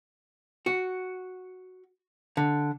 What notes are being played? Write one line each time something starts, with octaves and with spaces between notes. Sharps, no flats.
F#4
D3